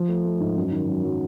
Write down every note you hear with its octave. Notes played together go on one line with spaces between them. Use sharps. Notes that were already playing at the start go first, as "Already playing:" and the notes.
Already playing: F3
A3
A3
G#2
F#2
D#3
F#2
F#3